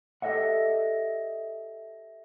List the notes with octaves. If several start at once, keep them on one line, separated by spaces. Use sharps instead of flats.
G4 A4 A#4 D#5 E5 F#5